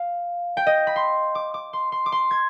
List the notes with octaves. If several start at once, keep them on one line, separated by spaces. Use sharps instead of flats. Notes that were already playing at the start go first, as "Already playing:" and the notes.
Already playing: F5
G5
D#5
B5
C6
D6
D6
C6
C6
D6
C6
G#6